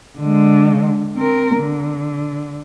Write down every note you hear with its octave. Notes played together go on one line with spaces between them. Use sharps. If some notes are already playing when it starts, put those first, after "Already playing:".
D3 G#3
C4 A#4
D3